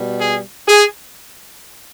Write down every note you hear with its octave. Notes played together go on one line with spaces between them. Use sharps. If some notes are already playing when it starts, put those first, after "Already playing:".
Already playing: B2 G3
G#4
G#4